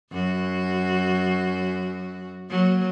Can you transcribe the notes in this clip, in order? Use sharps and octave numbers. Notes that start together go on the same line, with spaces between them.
F#2 F#4
F#3 A#3